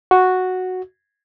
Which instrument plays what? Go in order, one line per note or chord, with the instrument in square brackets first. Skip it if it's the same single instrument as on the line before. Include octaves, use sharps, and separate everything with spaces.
[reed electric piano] F#4